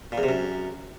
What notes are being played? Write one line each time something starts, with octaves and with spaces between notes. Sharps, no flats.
A#2
E2
C3
F#2